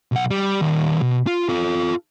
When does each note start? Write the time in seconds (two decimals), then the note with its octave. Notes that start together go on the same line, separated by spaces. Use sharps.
0.12 B1 F#5
0.31 G3
0.62 D#3 G3
1.02 B2
1.27 F4
1.49 F4 A4